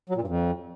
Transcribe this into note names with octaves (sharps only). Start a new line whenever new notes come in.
F#3
A#2
G2
F2